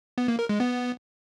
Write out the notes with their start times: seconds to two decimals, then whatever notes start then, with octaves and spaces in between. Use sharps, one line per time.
0.18 B3
0.28 A#3
0.39 A#4
0.49 G#3
0.60 B3